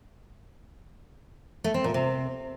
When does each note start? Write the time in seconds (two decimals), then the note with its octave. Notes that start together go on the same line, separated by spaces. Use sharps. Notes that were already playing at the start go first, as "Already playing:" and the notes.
1.64 A3
1.74 C4
1.84 A#2
1.94 C3